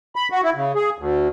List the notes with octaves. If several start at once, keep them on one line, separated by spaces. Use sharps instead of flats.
B5
F#4
E4
C#3
G#4
D2